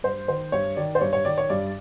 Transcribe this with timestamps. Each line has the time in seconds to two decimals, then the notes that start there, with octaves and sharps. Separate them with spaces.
0.03 G2 C5
0.28 D#3 C5
0.52 G2 C#5
0.76 D#3 D5
0.95 C5
1.01 G2 C#5
1.13 C#5
1.25 D#3 D5
1.38 C#5
1.50 G2 D5